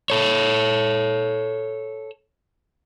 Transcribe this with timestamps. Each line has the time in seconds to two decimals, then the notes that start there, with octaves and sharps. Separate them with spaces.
0.10 A4 C#5